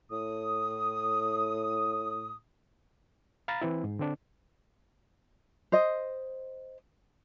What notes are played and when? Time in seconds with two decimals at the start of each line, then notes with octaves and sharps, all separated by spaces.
0.10 A2 D#6
3.48 F5 A#5 B5 A6
3.62 E3 C4 E4
3.84 G#2
3.99 D3 C4 D4
5.72 C5 D#5